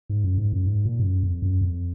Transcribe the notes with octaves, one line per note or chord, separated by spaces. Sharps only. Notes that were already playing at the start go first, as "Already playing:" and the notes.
G#2
F#2
G#2
F#2
G#2
A#2
G#2
F#2
F2
F#2
F2